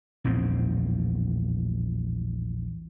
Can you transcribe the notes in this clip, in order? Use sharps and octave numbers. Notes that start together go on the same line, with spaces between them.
A#1 E2 A2 C4